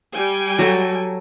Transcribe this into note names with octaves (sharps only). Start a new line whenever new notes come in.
G3 G5 G#5
F#3 A4